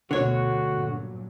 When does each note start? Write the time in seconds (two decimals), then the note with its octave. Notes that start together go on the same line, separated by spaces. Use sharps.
0.11 D2 B2 D3 F#4 C#5
0.72 G2 A#2 F#3